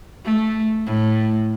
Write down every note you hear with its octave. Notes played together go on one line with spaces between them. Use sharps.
A3
A2